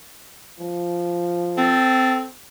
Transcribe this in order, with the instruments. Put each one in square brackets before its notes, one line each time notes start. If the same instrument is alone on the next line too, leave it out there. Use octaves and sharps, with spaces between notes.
[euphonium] F3
[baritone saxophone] C4 [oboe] A4